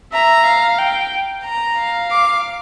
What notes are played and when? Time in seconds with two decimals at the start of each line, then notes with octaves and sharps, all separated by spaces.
0.13 E5 A#5
0.46 F5
0.79 G5
1.44 A#5
1.78 F5
2.10 D6